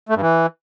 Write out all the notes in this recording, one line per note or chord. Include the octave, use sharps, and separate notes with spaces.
A3
G2
E3